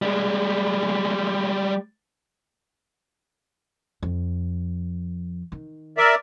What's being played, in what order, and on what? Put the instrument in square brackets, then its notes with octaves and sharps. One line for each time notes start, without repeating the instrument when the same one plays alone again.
[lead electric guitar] G3 G#3
[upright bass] F2
D#3
[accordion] A#4 D5 E5